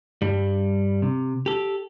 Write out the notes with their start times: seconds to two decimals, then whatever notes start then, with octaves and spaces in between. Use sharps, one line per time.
0.22 G2 G3
1.02 C3
1.46 G4 A4